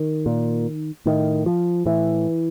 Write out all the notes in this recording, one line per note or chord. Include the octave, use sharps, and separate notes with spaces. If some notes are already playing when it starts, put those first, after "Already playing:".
Already playing: D#3
A#2
A2 D#3
F3
A2 E3